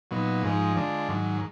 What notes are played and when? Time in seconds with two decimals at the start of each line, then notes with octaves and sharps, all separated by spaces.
0.11 A#2 F#3 B3 D#4
0.43 G#2 F3 G#3 D#4
0.76 D3 G#3 D4 F4
1.09 G#2 D#3 F#3